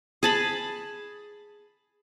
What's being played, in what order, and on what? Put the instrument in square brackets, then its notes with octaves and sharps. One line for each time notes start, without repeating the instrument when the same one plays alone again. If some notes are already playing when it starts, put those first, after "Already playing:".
[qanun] G#4 A5 B5